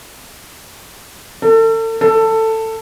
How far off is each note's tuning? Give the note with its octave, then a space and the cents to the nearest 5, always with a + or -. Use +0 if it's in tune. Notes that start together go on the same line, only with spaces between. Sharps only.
A4 +35
A4 +15